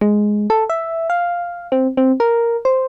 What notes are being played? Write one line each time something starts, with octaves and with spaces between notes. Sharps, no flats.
G#3
A4
E5
F5
C4
C4
A#4
C5